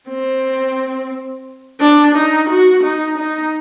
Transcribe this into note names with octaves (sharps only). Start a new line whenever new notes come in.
C4
D4
D#4
F#4
D#4
D#4